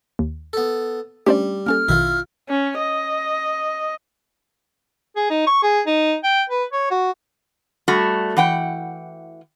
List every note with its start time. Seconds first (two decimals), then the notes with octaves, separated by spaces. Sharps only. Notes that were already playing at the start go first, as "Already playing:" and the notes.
0.19 D#2
0.53 B3 A4
1.27 G3 A3 C#4 D4 G4 C5 D5
1.66 A#3 C#4 A4 F6
1.88 A#1 B2 D#3 E4 F4
2.49 C#4
2.79 D#5
5.16 G#4
5.30 D#4
5.47 C#6
5.63 G#4
5.87 D#4
6.24 G5
6.50 B4
6.73 C#5
6.91 F#4
7.88 G3 A3 F#4
8.37 E3 F#5 G5